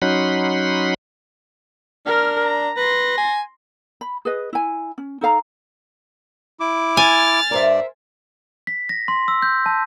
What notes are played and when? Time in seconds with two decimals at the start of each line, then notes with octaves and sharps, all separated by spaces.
0.02 F#3 C#4 D#4 F#5 B5 C6
2.06 D4 A#4 F6
2.45 A#5
2.77 B4 C6 A#6
3.18 G#5
4.01 B5
4.25 G#4 B4 D#5
4.53 E4 G#5
4.98 C#4
5.21 D#4 A4 F5 A#5
6.60 E4 D6
6.97 G#5 F6 A6
7.51 G2 A#4 C5 D5 E5
8.67 B6
8.89 A#6
9.08 C6
9.28 E6
9.42 G6
9.66 A5